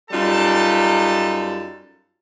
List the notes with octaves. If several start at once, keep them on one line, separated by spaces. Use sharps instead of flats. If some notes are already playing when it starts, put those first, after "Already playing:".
F#2 G3 D#4 F4 A4 A5